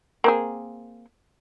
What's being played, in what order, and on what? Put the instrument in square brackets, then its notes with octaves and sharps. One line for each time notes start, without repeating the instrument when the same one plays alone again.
[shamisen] A#3 C4 G#4